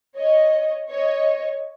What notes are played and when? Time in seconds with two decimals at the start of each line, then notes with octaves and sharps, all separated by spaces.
0.16 C#5 D#5
0.90 C#5 D#5